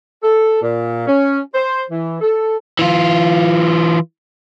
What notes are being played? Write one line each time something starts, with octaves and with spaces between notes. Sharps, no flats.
A4
A#2
C#4
C5
E3
A4
E3 F4